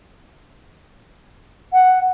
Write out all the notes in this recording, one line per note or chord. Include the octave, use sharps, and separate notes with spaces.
F#5